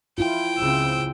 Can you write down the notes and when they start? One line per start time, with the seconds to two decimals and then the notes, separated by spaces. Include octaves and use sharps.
0.18 E4 F4 G5
0.58 C#2 C#3 C4 E6